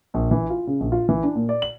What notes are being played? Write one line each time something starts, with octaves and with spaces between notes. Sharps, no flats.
A#1
E3
F4
C#3
A#1
F4
E3
D4
A#2
D5
F#7